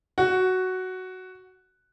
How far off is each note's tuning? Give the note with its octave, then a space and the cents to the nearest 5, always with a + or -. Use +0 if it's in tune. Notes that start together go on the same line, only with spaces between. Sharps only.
F#4 +5